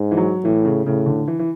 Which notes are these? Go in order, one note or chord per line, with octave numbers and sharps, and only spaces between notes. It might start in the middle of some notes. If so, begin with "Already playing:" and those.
Already playing: G#2
E3
F#3
A2 E3
C#3
A2 C#3
D3
E3
E3